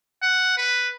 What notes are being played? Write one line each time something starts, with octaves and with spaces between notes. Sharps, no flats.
F#5
B4